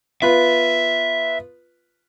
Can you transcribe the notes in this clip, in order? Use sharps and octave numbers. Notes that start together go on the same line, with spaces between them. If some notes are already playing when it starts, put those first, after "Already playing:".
B3 F4 B4 E5